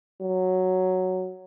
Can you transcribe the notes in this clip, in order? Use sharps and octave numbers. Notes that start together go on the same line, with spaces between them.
F#3